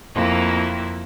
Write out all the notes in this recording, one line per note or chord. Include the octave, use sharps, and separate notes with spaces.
F2 A#3 E4